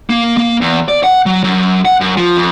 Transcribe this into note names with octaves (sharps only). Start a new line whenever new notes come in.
A#3
A#3
E2
D5
F#5
F#3
F#2
F#5
F#2
F3
F2